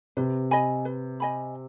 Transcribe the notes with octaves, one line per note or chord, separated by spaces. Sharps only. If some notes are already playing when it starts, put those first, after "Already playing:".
C3 B4
D#5 G#5 B5
B4
D#5 G#5 B5